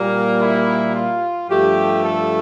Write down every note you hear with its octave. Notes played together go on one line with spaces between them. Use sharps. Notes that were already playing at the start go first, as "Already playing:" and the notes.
Already playing: A#2 G3 A#3
E4
F4
G2 F3 A3 G4
A4